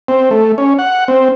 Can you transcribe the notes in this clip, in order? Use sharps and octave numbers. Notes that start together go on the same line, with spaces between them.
C4
A3
C#4
F#5
C4